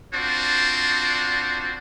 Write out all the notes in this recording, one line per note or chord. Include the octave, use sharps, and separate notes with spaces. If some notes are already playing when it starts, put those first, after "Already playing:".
C4 D4 F4 F#4 C5